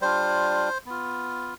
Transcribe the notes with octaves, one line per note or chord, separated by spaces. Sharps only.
G3 D4 F4 C5
B3 F4